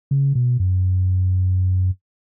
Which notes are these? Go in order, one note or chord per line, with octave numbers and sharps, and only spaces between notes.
C#3
B2
F#2